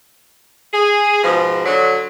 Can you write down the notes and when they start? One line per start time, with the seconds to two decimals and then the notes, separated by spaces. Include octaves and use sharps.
0.73 G#4
1.23 G#2 B2 F3
1.65 D3 F#3